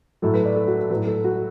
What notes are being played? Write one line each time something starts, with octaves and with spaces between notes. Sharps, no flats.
A2 F#3 A4
B4
D5
A4
F#4
A4
A2 F#3 B4
A4
F#4